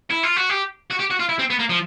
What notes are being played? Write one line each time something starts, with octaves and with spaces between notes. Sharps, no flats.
E4
F4
F#4
G4
F#4
G4
F#4
F4
E4
C4
B3
A#3
F3